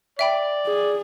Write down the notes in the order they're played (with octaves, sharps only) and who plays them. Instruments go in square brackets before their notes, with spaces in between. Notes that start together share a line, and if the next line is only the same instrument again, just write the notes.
[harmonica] D5 [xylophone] E5 G5 B5
[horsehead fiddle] G#4